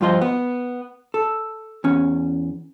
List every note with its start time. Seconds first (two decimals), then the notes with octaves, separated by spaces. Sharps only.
0.01 G2 F3 F4 C5 D#5
0.22 B3
1.14 A4
1.84 E2 C#4